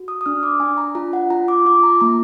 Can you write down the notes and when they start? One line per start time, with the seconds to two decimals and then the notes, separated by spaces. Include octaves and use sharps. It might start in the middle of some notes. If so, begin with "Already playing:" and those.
Already playing: F#4
0.08 D#6
0.21 D#6
0.26 D4 F6
0.43 D6
0.60 D4 G#5
0.78 A#5
0.95 F4 A#5
1.13 F#5
1.30 F4 A#5
1.48 D6
1.66 F4 D6
1.83 A#5
2.01 A#3 A#5